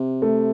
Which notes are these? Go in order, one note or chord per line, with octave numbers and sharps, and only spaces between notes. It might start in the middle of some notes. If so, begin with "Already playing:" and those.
Already playing: C3
A3